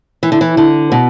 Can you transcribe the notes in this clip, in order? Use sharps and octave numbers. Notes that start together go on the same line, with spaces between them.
E3
D3
E3
D3
B2